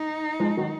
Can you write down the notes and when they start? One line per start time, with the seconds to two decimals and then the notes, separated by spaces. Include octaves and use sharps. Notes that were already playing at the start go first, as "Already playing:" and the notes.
Already playing: D#4
0.40 F3 G#3
0.57 D#3 F#3